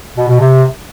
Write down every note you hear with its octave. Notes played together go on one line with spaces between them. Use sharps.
B2
B2
C3